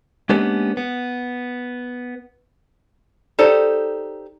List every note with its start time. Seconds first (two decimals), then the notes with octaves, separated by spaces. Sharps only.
0.30 G#3 A#3 B3 C#4 D4 G4
0.77 B3
3.39 D#4 G4 A4 C5 D5